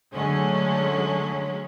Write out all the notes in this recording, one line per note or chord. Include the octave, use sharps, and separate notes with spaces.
D3 F#3 G#3 A3 C#4